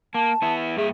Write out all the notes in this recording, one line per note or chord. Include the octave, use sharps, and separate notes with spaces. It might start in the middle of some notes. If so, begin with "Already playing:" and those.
A#3 A5
B3 E4
G2 A#3 G#4 E5